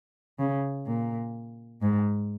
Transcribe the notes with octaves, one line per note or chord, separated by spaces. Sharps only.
C#3
A#2
G#2